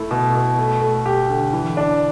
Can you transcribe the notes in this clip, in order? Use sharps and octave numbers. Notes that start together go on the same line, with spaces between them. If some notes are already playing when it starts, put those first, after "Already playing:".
Already playing: A3 E4
B2
B2
A3
A3
G4
D3
E3
D4